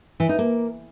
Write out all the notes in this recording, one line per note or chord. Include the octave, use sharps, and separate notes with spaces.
E3
D#4
A#3